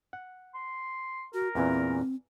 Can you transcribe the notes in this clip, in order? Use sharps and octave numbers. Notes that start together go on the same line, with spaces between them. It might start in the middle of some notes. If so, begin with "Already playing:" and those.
F#5
C6
F#4 A#4
E2 A#2 E3 C4